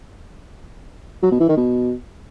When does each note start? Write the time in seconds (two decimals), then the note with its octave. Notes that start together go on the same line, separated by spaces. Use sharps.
1.23 F#3
1.32 B2
1.40 E3
1.49 D#3
1.57 B2